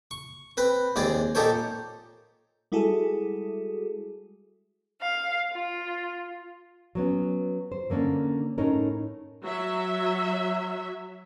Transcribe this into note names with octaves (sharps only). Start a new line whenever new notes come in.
C#6
C4 B4
D#2 G#3 C4 G#4 D5
A#2 D#4 G4 A4 C5 C#5
G3 G#3 E4 F#4 G#4 A4
F5
F4
F#3 B3 C#4
C5
D3 A#3 C#4 D4
A2 C#4 D#4 A#4
F#3 E5